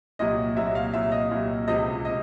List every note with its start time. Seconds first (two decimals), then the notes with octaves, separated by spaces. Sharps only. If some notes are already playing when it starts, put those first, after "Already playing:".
0.19 C2 A#2 F#3 D#5
0.56 C2 A#2 F#3 E5
0.75 F5
0.94 C2 A#2 F#3 E5
1.12 D#5
1.31 C2 A#2 F#3
1.67 C#2 C3 F3 D#5
2.05 C3 D#5